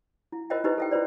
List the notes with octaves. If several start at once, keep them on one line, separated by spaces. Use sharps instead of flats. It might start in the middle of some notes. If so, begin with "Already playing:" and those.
E4
F4 A#4 C5 D#5 E5 G5
D#4 E4 G4 B4 C5 D#5
A4 E5 G5
E4 F4 B4 C5 D5